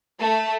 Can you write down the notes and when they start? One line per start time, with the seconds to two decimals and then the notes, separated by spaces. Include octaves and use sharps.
0.20 A3